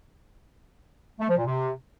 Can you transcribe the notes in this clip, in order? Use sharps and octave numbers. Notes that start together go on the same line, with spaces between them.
A3
F3
A#2
C3